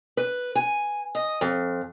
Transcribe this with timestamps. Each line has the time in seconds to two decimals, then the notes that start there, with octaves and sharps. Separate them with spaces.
0.17 B4
0.55 G#5
1.15 D#5
1.41 F2